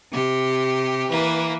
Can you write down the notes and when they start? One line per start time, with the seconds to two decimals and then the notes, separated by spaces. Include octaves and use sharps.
0.11 C3 G4
1.10 E3 A#3 B4